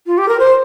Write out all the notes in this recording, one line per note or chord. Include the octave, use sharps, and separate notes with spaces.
F4
G4
A#4
C5